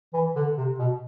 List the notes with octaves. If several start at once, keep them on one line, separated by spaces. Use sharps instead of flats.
E3
D3
C3
B2